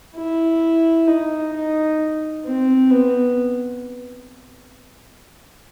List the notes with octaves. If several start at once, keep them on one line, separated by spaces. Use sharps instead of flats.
E4
D#4
D#4
C4
B3